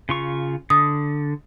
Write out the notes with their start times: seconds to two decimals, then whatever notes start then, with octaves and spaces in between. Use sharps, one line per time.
0.09 C#3 F4 C#6
0.70 D3 D#6